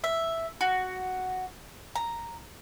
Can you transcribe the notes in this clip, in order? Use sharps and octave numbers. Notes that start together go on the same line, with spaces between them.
E5
F#4
A#5